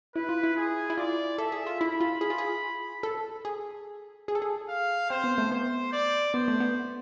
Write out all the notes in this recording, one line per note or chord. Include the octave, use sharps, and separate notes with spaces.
E4 B4
F4
E4
G#4
E4
F4 D5
A4 E5
G#4
F4
E4 B5
F4
G#4
F4
G#4
A4
G#4
G#4
A4
G#4
F5
C4 C5
B3
A3
B3 C5
D5
B3 C5
A3
B3